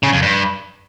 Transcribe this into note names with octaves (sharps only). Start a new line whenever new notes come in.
C#3
F2
G2